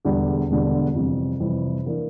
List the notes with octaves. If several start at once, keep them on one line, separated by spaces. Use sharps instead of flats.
E1 E2 D3 G3
E1 E2 D3 G3
F2 C3 E3 G3
F2 C3 E3 G3
E3 A#3 D4